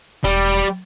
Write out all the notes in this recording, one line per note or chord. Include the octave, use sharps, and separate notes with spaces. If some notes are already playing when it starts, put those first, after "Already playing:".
E1 G3